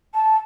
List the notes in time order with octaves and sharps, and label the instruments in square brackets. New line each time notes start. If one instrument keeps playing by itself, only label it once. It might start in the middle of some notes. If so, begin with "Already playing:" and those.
[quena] A5